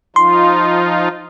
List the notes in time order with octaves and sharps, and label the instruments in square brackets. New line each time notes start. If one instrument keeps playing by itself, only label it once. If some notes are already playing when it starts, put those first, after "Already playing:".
[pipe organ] F3 D#4 F4 [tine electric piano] C6